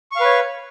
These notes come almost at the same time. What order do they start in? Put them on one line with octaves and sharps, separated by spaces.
C#6 F5 B4 C#5